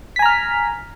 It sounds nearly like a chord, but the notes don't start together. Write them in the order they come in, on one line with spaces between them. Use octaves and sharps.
B6 G#5 A#5 F6